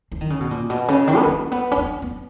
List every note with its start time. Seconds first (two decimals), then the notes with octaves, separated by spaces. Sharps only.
0.12 E3
0.21 D#3
0.30 C#3
0.40 B2
0.51 A#2
0.70 B2
0.88 C#3
1.07 D#3
1.17 B3
1.26 A#3
1.52 B3
1.72 C#4
1.77 B3
2.02 B3